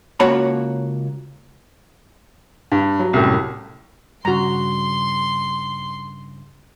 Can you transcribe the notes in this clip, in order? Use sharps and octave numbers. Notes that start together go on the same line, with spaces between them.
C#2 A#3 F#4 C#5 A5 B5
G2
F#3
C2 F#2 A2
G2 C#3 F#4 A#5 C6